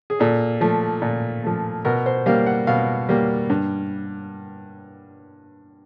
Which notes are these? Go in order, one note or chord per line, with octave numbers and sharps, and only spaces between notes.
G#4
A#2 A4
F3 A3
A#2
F3 A3
B2 A#4
C5
G3 A#3 F5
F#5
B2 F5
G3 A#3
G2